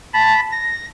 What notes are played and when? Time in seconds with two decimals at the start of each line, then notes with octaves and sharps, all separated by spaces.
0.14 A5 B5
0.52 A#6